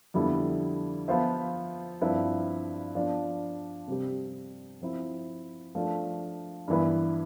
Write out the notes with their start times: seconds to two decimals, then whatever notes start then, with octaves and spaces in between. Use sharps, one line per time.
0.14 F2 D3 G3 B3 E4
1.08 F3 B3 F4 C5 E5
2.01 G2 F3 C4 E4 B4
2.95 F3 B3 D4
3.88 C3 G3 C4 G4
4.81 F3 C4 E4
5.75 F3 A3 D4
6.68 G2 E3 B3 E4 B4